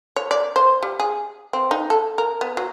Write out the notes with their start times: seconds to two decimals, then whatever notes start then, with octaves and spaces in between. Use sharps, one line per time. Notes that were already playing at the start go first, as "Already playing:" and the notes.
0.16 C#5
0.31 D5
0.56 C5
0.83 G3
1.00 G#4
1.53 C4
1.71 D#4
1.90 A4
2.18 A#4
2.41 B3
2.57 F#3